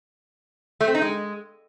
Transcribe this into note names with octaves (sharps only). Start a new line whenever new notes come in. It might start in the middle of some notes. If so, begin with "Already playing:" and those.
A3
C4
D#4
G#3